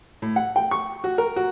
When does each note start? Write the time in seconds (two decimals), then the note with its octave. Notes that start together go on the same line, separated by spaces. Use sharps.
0.22 A2
0.36 F#5
0.56 G5
0.71 C#6
1.04 F#4
1.18 A#4
1.36 F#4